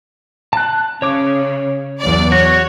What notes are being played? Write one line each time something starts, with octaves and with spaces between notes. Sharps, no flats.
A5 F#6
C#3 C#5 D6
E2 F#3 D5
F#4 C#5